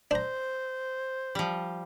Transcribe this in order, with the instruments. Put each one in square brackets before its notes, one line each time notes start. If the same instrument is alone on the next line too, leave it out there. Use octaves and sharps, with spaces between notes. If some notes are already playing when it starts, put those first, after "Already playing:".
[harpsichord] D4 A#5 [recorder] C5
[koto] F3 G3